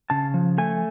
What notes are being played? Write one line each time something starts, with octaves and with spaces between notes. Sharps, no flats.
C#3 A5
F3
A3 G#5